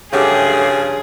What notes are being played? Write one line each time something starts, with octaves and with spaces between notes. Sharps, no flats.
G2 C#3 F3 F#3 A3 G4 G#4